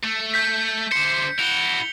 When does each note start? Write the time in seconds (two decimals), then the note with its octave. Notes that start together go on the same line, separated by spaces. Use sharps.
0.03 A3
0.34 G6 B6
0.91 D3 C5 C#7
1.39 E4 F#4 F7 G7